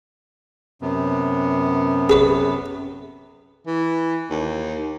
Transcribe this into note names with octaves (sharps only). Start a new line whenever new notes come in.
F#2 C3 B3
G#4 B4 C#5
E3
D#2